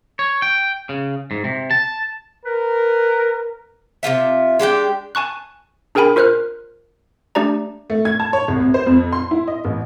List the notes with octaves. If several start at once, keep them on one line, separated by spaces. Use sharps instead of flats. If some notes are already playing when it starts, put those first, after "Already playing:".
C#5
G5
C#3
G#2
C3
A5
A#4 B4
C3 D#4 F4 E5
G#3 D4 G4 G5
G#5 A5 C#6 F#6
D4 G#4 A#4 G5 G#5 B5
F4 A#4 C5 F6 F#6
A3 D4 G4 D5 A#5
A3
G#6
A5
C#5
C2
C3
C5
F2
C6
E4
D#5
A1